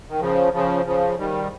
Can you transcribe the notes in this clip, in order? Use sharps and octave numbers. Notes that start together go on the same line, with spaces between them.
D#3
C#3 F3
C#3 F3
C#3 F3
D#3 G3